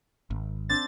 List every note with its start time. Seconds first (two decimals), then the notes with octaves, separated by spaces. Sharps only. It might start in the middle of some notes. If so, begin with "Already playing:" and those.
0.30 G#1
0.69 C4 D4 A6